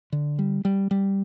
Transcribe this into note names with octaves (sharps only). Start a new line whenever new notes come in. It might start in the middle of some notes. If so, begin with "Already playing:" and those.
D3
G3
G3
G3